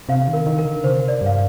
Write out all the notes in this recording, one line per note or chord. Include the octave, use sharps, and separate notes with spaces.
C3 F5
D#3
A#4
D#3
A#4
D3
C3 C5
D5
G2 F5